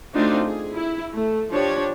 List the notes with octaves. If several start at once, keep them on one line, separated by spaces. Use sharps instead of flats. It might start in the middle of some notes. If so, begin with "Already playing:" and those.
A3 C4 D4 D#4 F4 F#4
G#4
E4
A3
F3 D4 G4 C#5